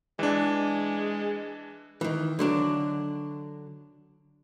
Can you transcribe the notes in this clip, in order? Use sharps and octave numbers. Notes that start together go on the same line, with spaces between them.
E3 G#3 D4
D#3 E3
D3 F#3 D4